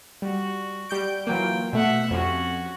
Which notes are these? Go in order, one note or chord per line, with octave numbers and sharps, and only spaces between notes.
G3 F#4
G3 G6 D7
E3 F#3 A#3 F4 G5
B2 A3 E5 F#5
F2 C#4 F#4